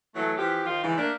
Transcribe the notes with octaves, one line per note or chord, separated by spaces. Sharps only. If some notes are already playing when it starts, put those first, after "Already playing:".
E3 F#3 A3
E3 F3 G4
D#3 F3 F4
G#2 C#3 E3
A3 A#3 D4